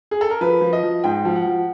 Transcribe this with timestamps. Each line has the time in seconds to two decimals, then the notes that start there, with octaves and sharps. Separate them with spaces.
0.11 G#4
0.21 A4
0.30 A#4
0.41 F3 B4
0.61 F3
0.73 D#5
0.83 F3
1.04 G#2 G5
1.25 F3
1.36 F#5
1.46 F3